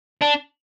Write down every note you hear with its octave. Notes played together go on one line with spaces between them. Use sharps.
D4